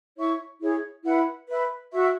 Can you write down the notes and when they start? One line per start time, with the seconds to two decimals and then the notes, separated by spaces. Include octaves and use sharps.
0.17 E4 C#5 E5 C#6
0.60 E4 G#4 C#5
1.04 E4 B4 F#5 B5
1.48 B4 E5 B5
1.92 F#4 E5 C#6